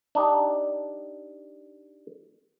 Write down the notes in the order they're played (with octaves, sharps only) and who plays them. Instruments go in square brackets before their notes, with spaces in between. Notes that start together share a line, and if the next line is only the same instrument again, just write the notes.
[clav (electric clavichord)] D4 D#4 G4